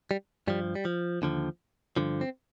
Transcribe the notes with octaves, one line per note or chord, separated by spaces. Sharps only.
G3
G2 F3 G3
G3
F3
D#2 D3 F3
G2 D3 F3
C4